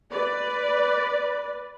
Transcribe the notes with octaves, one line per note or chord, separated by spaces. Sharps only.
B4 D5